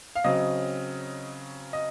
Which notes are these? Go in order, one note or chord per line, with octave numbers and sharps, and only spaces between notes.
F5
C#3 F#3 C4 D#5
D#5